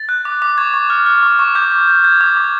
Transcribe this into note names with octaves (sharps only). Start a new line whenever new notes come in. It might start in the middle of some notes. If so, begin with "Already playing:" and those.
Already playing: A6
F#6
D6
D6
C#6 G#6
C#6
F6
F6
C#6
C#6
D6 G6
D6
G6
G6 G#6
D6
D6